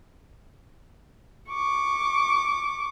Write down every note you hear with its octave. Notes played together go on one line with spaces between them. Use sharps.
C#6 D6